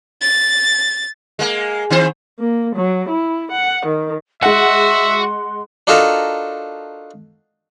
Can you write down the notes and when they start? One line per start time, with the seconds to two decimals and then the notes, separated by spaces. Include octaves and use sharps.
0.21 A6
1.39 G#3 A#3
1.90 D#3 C4 C5
2.39 A#3
2.76 F#3
3.09 E4
3.51 F#5
3.86 D#3
4.43 G#3 F#4 E5 F#5 C6
5.87 D4 D#4 F4 F#4 A4 A#4